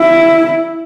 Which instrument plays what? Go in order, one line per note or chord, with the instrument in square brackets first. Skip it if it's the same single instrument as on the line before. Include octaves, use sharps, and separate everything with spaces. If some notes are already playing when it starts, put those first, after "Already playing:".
Already playing: [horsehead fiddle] E4